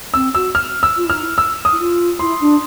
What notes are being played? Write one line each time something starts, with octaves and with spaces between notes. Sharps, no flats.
C4 E6
F#4 E6
F6
E6
F4
E4
D#4 F6
E4
E6
D#6
E4
F4
E4 C6
D4